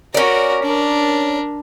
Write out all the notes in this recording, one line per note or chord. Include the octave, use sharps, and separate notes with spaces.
C#4 F#4 A#4 D5
D4 A#4